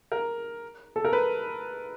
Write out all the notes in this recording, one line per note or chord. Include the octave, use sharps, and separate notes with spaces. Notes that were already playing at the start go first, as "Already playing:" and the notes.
A#4
A4
A#4
B4